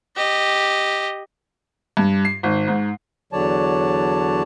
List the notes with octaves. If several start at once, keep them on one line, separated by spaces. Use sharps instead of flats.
G4 D#5
G2
C7
G#1
G#2
E2 D3 F#3 C#5 D5 A5